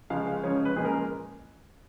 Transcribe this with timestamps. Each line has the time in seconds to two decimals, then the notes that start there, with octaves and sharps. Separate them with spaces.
0.10 C#2 C#3 F3 G#3 F5
0.27 F5
0.43 F#2 C#3 F3 G#3 C#5
0.65 B4
0.76 A#2 F3 G#3 C#4 G#4
0.85 A#4